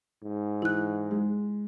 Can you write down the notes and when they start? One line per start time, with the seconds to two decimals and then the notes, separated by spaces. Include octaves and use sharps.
0.23 G#2
0.62 E3 E4 F#6
1.11 G#3